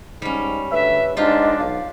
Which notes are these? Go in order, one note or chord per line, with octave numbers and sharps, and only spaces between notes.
G#2 G3 C#4
D2 B4 E5
G#2 D4 F4 G4 D#5
B1 F5